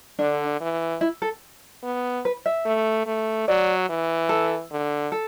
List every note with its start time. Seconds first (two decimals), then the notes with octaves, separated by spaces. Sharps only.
0.19 D3 D4
0.61 E3
1.01 E4
1.22 A4
1.84 B3
2.25 B4
2.46 E5
2.66 A3
3.06 A3
3.48 F#3 D5
3.89 E3
4.29 A4
4.71 D3
5.12 A4